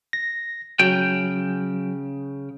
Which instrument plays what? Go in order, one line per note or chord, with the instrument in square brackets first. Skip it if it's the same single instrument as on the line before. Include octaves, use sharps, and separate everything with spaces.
[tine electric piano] A#6
[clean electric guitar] C#3 G5 [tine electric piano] F#3